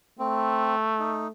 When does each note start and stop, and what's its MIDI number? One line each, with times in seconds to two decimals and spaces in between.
0.19 1.31 57
0.19 0.75 60
0.99 1.28 63